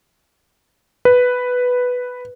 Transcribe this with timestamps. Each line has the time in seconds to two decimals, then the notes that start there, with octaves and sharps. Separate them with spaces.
1.05 B4